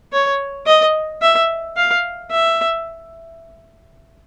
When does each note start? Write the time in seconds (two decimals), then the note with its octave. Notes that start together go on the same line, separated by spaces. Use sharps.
0.12 C#5
0.67 D#5
1.22 E5
1.76 F5
2.31 E5